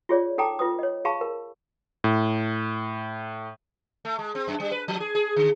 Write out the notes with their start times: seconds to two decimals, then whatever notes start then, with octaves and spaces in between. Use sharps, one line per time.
0.09 F4 G#4 C#5 D5
0.38 D#4 A4 G5 A#5 D6
0.59 F4 B4 D#6
0.79 C#5 D#5
1.05 G#4 F5 A5 B5 C#6
1.21 A#4
2.04 A2
4.05 A3
4.19 G#3
4.35 C4
4.48 F#2
4.60 G3
4.71 B4
4.88 F3
5.00 G#4
5.15 G#4
5.36 D3